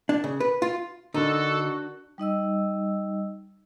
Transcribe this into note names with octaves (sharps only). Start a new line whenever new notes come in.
D4
C#3
B4
F4
D3 D4 D#4 F#4 A4 A#4
G3 D#4 D#5 E6